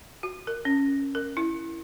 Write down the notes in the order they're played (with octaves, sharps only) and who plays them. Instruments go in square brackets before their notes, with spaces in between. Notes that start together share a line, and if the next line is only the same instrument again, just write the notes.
[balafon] F#4
A#4
C#4
A#4
E4